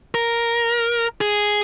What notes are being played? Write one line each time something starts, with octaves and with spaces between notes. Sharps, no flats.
A#4
G#4